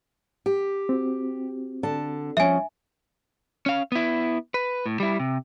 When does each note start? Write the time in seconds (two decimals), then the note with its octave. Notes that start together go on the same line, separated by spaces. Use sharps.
0.46 G4
0.89 C4 F#4
1.83 D3 A5
2.37 F3 C#4 E5 G#5
3.66 C#4 F5
3.92 B3 E4
4.54 B4
4.86 A2
5.00 G3 E4
5.20 C3